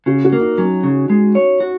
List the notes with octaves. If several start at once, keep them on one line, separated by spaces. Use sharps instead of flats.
C#3 F#4
F#4
A#3
D#4
F#3 C#4
C#3
G#3
C#5
F#4